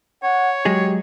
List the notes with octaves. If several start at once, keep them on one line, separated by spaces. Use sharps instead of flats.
C#5 F#5
F#3 G#3 G4 G#4